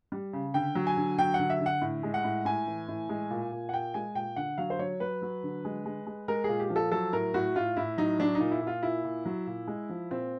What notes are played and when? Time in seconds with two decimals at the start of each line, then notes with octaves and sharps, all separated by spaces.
0.12 G3
0.33 C#3
0.54 D3 G5
0.75 F#3
0.87 G#5
0.97 D3
1.19 F#3 G5
1.34 F#5
1.39 D3
1.50 E5
1.60 D3
1.66 F#5
1.81 A2
2.03 G#3
2.14 F#5
2.24 A2
2.45 A2 G#5
2.67 E3
2.88 A2
3.09 G#3
3.30 A#2
3.52 A#2
3.69 F#5
3.73 A#2 G5
3.94 G#3 G#5
4.15 A#2 G5
4.36 D3 F#5
4.58 F#3 F5
4.70 C5
4.79 F#3 C#5
5.00 F#3 B4
5.22 F#3
5.43 D3
5.65 G#3
5.86 G#3
6.07 G#3
6.28 G#3 A#4
6.44 A#2 G#4
6.59 G4
6.70 F3
6.76 A4
6.92 F#3 A4
7.13 A2 A#4
7.34 A2 F#4
7.56 A2 F4
7.77 A2 E4
7.98 F#3 D#4
8.19 F#3 D4
8.35 D#4
8.40 A#2
8.51 E4
8.62 A#2
8.67 F4
8.83 A#2 E4
9.04 A#2
9.25 F#3
9.47 A#2
9.67 G#3
9.89 F3
10.11 A#2 C4